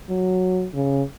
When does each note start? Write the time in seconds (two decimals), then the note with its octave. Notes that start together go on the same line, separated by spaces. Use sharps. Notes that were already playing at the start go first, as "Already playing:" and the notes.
0.09 F#3
0.74 C#3